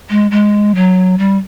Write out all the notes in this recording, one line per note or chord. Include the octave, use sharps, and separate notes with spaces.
G#3
G#3
F#3
G3